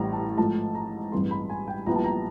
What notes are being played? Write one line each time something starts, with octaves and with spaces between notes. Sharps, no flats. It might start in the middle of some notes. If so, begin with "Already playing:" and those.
Already playing: A1 A2 E3 G3 A#5
A5
G#2 F3 A3 A5
A#5
A1 G2 E3 G#3 C4 C6
B5
G#5
G5
A#1 A#2 G3 B3 E4 A#5
A5
A#5